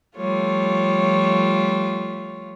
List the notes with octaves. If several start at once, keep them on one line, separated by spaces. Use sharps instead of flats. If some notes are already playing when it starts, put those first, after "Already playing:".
F3 G3 A3 F4 C#5